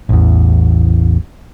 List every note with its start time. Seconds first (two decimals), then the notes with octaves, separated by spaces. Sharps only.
0.09 A1 E2